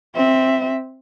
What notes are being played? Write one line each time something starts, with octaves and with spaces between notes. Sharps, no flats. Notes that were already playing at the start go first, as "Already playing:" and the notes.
C4 E5